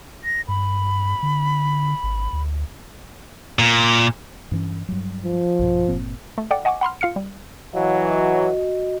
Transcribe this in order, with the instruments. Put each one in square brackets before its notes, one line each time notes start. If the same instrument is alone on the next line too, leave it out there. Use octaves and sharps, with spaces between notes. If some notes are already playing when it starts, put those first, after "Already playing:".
[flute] A#6
[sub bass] G2 [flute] B5
[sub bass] D3
G#1
D2
[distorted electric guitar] A#2
[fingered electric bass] G2 E3 C#4
G2 F#3
[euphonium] F3
[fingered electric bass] A#1 G2 B2
G1 A#2 C4
[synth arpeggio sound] A3
A4 D5 F#5 G5 D6
D#5 F#5 G#5 C#6 D6
F#5 B5 C6 F6
F4 F5 F6 C#7
G3
[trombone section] E3 F#3 [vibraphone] D#5 F5
[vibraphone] F#4 D#5